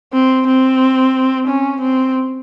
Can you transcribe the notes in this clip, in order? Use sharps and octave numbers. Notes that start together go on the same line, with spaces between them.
C4
C4
C#4
C4